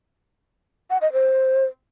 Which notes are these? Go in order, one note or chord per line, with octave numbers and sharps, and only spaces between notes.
F#5
D#5
C5